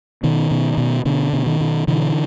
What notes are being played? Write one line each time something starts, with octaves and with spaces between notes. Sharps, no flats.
B2 D#3
B2
B2
B2 D3
B2
D#3
B2
B2 D3 E3